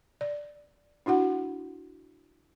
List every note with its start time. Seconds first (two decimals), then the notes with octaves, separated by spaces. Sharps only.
0.21 D5
1.06 D4 E4 F#4 F#5